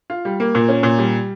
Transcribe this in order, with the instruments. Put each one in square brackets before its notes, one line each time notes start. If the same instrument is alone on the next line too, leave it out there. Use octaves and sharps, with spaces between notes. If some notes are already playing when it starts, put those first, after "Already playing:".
[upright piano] F4
G3
A#3
A#2
C#4
A#2
G3